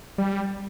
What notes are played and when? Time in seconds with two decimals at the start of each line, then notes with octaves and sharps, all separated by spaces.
0.18 G3